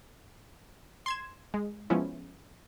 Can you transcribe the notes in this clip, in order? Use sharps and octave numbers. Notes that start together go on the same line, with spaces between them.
C6 G#6 E7
G#3
F3 G#3 B3 C#4 E4